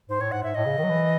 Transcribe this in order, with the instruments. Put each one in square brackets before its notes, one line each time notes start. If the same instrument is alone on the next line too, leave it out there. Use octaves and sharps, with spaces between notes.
[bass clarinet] G#2 [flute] C5
[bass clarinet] A2 [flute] C#5
[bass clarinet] G#2 [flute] F#5
[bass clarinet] G#2 [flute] E5
[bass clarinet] A2 [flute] D#5
[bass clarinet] C#3
D#3
F#3
E3